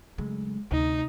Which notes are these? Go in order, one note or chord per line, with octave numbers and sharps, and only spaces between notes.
C#3 F#3 G#3 A3
D2 C3 D#4